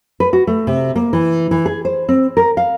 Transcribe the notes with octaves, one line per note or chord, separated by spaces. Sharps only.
B4
F#4
A3
C3
A#3
E3
E3
G#4
C5
C4
A#4
F5